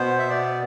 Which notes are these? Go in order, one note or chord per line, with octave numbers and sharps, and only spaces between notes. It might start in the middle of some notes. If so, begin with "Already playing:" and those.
Already playing: B2 B3 C5
E5
D5